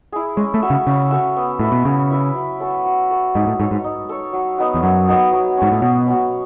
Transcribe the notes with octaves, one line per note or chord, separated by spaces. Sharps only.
E4 G#4
G#3 C#4
A3
F#4 A4 E5
C#3
C#3 C#4
F#4 A4 E5
B3
A2 E4 B4 E5
B2
C#3 B3
E4 B4 E5
F#3
C#4 F#4 A4
F#3
C#4 F#4 A4
G#2 D#4
A2
G#2 A4 C#5
G#2
D#4
A4 C#5
F#3
B3 D#4 F#4
E2
F#2 F#3
B3 D#4 F#4
F#3
G#2 C#4 F#4
A2
B2 F#3
C#4 F#4